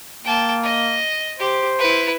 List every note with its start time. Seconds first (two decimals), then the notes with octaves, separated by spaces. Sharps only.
0.25 A#3 G5 A5
0.63 D#5
1.39 G4 C5
1.78 E4 B4